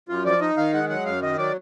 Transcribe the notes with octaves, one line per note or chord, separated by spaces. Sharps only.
F#2 F4
F3 D5
D#4 D#5
D#3 F5
G#3 F#5
F#3 F#5
F#2 F5
D#3 D#5
F#3 D5